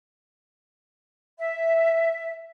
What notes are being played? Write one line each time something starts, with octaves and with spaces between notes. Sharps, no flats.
E5